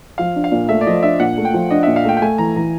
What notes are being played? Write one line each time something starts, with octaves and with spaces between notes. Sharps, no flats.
F3 F5
D4
F5
A#2
A3 E5
D5
F3 D#5
D4 E5
A#2 F#5
A3
G5
F3
D4 D#5
E5
A#2
F5
A3 G5
G5
A3 G#5
E3 A#5
E3 A#5